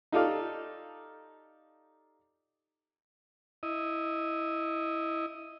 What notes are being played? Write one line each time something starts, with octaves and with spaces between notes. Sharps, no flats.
D#4 F4 G4 A4 D5 F5
E4 D#5